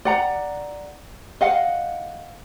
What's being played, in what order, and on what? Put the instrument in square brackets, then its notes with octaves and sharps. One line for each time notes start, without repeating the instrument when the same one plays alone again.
[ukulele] D5 F#5 A#5
D#5 F5 F#5